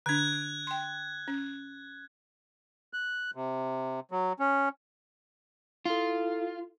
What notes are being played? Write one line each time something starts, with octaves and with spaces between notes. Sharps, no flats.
D3 D4 F#6 G#6
G5 C6
C#4
F#6
C3
F#3
C#4
E4 F4 A4